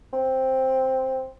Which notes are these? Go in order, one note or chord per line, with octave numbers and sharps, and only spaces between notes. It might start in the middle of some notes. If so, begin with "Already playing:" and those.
C4